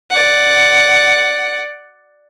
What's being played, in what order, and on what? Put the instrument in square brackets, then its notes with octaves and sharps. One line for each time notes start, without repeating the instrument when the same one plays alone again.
[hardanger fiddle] D5 F#5